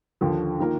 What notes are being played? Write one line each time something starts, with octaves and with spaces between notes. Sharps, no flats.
D#2 D3 F3
D#3 A#3 F4 A#4